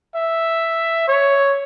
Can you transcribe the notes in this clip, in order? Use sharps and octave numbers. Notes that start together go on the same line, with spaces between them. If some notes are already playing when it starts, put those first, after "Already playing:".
E5
C#5